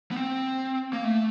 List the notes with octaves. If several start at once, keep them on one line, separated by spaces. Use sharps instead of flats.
B3
C4
A#3
A3